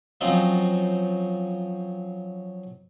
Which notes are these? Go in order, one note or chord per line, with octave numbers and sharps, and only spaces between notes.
F3 F#3 C4 C#4 D#4 F4